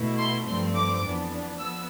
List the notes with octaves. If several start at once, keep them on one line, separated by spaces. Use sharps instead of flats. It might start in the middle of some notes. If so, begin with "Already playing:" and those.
Already playing: B2 A3 E4
C6
G2 F3 A3 C4 C6
D6
F2 E3 B3 D4
F3 B3 E6